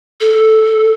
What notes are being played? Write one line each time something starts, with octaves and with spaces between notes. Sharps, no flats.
A4